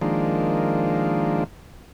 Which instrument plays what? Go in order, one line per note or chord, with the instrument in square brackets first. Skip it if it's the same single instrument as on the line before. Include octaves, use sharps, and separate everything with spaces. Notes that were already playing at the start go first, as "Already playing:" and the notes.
[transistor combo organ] D#3 F3 G#3 A#3 D4